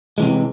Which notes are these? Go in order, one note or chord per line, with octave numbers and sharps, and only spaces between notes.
C3 E3 G#3